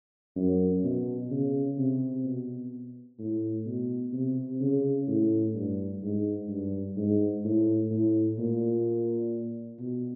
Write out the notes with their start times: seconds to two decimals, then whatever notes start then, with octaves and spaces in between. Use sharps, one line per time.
0.36 F#2
0.84 B2
1.31 C#3
1.78 C3
2.25 B2
3.19 A2
3.66 B2
4.13 C3
4.61 C#3
5.07 A2
5.55 G2
6.03 G#2
6.49 G2
6.97 G#2
7.44 A2
7.90 A2
8.39 A#2
9.80 B2